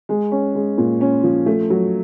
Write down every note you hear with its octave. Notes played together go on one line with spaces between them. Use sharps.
G#3
C#4
G#3
A#2
C#4
F3
A3
F#3